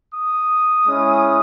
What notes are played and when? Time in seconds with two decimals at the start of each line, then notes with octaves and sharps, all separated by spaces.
0.13 D#6
0.86 G#3 C#4 E4